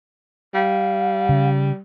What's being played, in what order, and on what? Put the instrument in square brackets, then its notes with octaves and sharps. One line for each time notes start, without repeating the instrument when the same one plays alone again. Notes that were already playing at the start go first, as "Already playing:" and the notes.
[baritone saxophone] G3 [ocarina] F5
[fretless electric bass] C#3